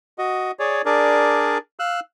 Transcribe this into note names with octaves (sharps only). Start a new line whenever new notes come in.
F#4 D#5
G#4 C#5 D5
D4 G#4 A#4 D5
F5 E6 F#6